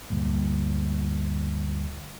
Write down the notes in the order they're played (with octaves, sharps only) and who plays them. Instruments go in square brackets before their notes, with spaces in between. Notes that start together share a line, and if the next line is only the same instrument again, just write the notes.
[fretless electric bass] D2 G2 A#2